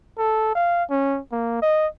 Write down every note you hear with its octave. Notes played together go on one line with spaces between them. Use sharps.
A4
F5
C#4
A#3
D#5